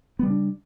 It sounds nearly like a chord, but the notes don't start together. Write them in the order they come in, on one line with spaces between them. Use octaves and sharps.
B3 G3 C#3 D4